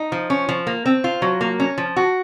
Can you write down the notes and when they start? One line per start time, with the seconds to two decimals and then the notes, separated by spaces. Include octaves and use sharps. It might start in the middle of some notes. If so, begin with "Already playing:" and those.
Already playing: D#4
0.12 F3
0.30 C#4
0.49 F3
0.67 A#3
0.86 C4
1.04 F4
1.22 F#3
1.41 A#3
1.60 C#4
1.78 F3
1.96 F#4